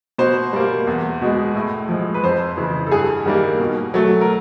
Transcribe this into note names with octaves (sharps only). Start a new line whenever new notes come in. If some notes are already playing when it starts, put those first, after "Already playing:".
B2 C5
G3 A#3
E2
B2 G#3
A2
F3 G#3
B4
F2 C5
C#3 E3
A4
G2 G#4
D#3 G3 A#3
B2
F#3 A3
A#4